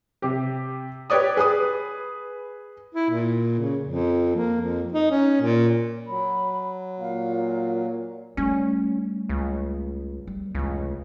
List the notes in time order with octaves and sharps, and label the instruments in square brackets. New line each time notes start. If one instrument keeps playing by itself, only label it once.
[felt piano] C3 G4
G4 B4 C#5 D5 D#6
G#4 B4 D#6
[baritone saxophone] E4
A#2
C#3
F2
A#3
F2
D#4
C#4
A#2
[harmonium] F#3 [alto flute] B5
[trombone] A#2 [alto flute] F5
[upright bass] G3 A3 [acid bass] C#4
[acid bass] C#2
[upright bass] G3
[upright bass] F1 E3 [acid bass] C#2